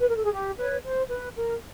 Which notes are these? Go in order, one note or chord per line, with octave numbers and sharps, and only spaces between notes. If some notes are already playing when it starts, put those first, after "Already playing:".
B4
A#4
A4
G#4
G4
B4 C#5
C5
B4
A#4